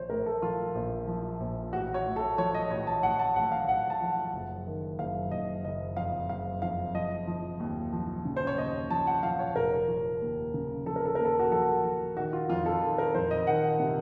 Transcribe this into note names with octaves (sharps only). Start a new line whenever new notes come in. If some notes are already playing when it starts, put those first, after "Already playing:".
Already playing: A#1 F3 C5 C#5
A2 A#4
A4
F3 F4
A#1
F3
A#1
A1 F#4
C#5
A2
A4
F3 C#5
D#5
A1 C#5
A5
A1 F#5
A5
A1 F#5
F#5
F5
A1 F#5
A5
F3
F#5
F#1
D#3
F#1 F5
F#1 D#5
F#1 D#5
F2 F5
F#1 F5
F2 F5
F3 D#5
F3
D#2
F3
C#3
C5
C#5
D#2 D#5
F3 A5
F#5
F3 F5
C#5
F1 A#4
F3
D#2
C#3
F3 A4
A#4
A4
D#2 A#4
A4
F#4
F3 A4
F3
D#3 F#4
F4
F2 F4
A4
D#3
A#4
F2 C5
D#5
D#3 F#5
C3